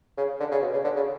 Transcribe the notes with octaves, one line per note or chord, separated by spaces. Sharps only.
C#3
D3
C#3
B2
C#3
D3
C#3